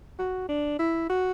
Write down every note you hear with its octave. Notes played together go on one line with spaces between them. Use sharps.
F#4
D4
E4
F#4